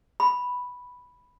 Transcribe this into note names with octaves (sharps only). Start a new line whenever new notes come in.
B5